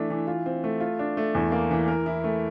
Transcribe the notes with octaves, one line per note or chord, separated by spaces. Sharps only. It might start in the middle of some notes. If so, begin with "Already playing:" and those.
Already playing: E3 A3 D4
E3
F4
C4
A3
F4
D4
A3
E2
A#3
E3
A#4
E4
A3